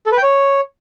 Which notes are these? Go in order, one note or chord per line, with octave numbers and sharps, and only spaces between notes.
A4
B4
G5
C#5